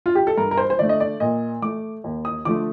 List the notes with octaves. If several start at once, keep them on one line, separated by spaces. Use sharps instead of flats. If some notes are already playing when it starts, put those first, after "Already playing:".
F4
G4
A4
G2 A#4
A#4
C5
C5
D3 A3 D5
D#5
D5
A#2 D#5
A3 D6
D#2
D#6
D3 F3 A3 D6